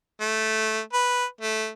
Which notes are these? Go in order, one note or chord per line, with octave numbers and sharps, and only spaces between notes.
A3
B4
A3